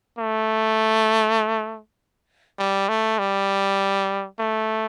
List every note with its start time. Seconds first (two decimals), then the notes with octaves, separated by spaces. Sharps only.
0.19 A3
2.59 G3
2.89 A3
3.19 G3
4.39 A3